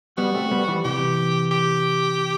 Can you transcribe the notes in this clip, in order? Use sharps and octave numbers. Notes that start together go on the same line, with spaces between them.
G3 B3 F#4
A3 C4
G3 B3
E3 G3
C3 E3 G4
G4